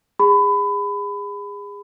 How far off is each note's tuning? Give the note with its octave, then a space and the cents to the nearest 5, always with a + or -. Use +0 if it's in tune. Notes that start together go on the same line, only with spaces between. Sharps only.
G#4 -30 B5 +25